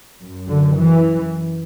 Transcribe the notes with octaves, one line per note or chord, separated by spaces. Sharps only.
F#2
D3
E3